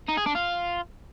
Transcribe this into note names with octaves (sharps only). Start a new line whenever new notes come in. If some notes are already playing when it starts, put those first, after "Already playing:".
D#4
G#4
D4
F4